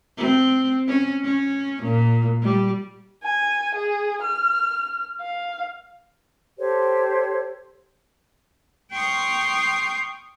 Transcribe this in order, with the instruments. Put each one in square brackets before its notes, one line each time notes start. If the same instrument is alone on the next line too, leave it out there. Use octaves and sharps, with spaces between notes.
[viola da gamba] C4
C#4
C#4
A#2
G3
[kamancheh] G#5
G#4
F6
F5
[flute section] G4 A4 C5 C#5
[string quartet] G5 C6 C#6 D#6 F6 G6